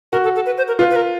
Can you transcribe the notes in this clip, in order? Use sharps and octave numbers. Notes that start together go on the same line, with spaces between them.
F#4 A#4
A4
A4
B4
C5
A#4
F4 B4
B4
A#4